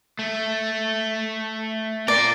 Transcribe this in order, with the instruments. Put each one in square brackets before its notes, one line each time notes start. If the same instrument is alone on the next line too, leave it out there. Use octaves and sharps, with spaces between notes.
[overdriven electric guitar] A3
[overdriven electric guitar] F4 A#4 [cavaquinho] D5